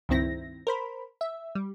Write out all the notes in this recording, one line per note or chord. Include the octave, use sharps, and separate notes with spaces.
C#2 G2 D#3 C4 E4 A#6
A#4 C5 B5
E5
G3